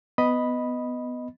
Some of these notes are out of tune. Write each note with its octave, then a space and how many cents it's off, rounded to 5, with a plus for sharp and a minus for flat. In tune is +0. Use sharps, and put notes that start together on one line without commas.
B3 +10 D#5 +0 B5 +0